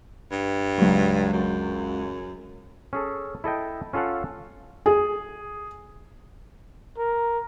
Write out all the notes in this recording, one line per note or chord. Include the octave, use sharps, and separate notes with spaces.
G2
C#2 F#3
F#2
C#4 G#4 A4
E4 A4 D#5 G5
C#4 F4 A4 F5 F#5
G#4
A#4